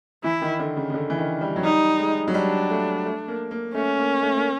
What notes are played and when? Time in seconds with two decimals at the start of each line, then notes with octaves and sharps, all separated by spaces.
0.24 E3 E4
0.42 D#3
0.59 D3
0.76 C#3
0.90 C#3
0.94 D3
1.10 E3
1.18 D#3
1.41 G3
1.56 F#3
1.64 G3 D#4
1.99 G#3
2.28 F#3
2.34 G3 D4
2.70 A3
3.05 A3
3.28 A#3
3.51 A#3
3.74 A3 C#4
3.99 A#3
4.22 A3
4.37 A#3